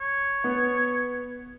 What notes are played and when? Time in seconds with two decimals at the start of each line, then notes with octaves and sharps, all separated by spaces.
0.01 C#5
0.44 B3